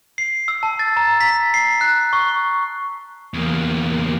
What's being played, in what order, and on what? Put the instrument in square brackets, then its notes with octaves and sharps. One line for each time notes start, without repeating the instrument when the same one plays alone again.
[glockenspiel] C7
E6
A5
A6
A#5
B6
C7
F#6
C#6
[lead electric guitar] E2 A#3